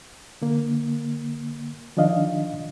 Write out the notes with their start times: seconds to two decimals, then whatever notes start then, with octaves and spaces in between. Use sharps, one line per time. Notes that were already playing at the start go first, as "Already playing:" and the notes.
0.42 D3 A#3
1.97 D#3 F3 D4 D#5 F5